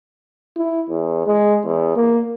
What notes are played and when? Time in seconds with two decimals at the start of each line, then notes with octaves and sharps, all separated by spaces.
0.56 E4
0.90 E2
1.27 G#3
1.64 E2
1.96 A#3